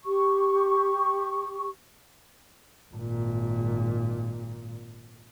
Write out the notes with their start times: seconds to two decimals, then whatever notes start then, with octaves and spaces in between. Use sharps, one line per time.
0.05 G4 C#6
2.93 G#1 A#2